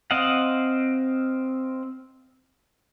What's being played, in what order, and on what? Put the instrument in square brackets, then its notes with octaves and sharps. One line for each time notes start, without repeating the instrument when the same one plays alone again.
[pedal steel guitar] C4 D#5 F5 F#5